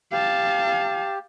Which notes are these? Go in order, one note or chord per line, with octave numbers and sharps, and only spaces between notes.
G4 F5 A5